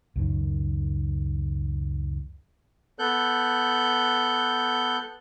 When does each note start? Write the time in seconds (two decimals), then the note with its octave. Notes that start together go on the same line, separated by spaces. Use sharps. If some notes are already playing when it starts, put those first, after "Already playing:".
0.16 C#2 F#2 D#3
2.99 B3 A4 F#6 G6